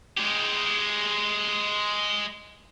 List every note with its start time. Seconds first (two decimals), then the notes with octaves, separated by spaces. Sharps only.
0.17 G#3 G4